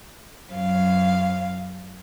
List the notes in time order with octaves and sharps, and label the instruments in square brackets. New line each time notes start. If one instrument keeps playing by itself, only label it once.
[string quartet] F#2 F5